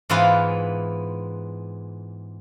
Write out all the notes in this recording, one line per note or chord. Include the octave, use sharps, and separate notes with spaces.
G#2 E3 B3 F4 B4 F5